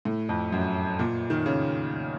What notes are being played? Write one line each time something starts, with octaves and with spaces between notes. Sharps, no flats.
A2
F2
F#2
A#2
D#3
C#3